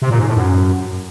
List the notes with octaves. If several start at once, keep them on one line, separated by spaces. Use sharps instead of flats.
C3
A#2
G#2
A2
F#2